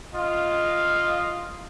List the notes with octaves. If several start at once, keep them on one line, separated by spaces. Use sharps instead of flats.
F4 D#5 F5